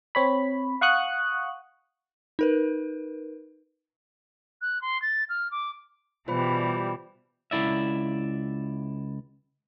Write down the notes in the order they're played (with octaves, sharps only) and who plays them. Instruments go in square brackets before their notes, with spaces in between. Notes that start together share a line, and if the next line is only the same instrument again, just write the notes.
[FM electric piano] C4 C#5 B5
F5 F#5 C#6 D#6 F#6
[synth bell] D#4 A#4 B4
[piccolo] F#6
C6
A6
F6
D6
[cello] B2 E3 [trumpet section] G3 [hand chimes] F4 C5 B5
[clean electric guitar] C#2 F3 E4 D5 E5